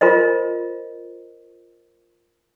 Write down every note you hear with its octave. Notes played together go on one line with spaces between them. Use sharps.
F4 A#4 C5 D#5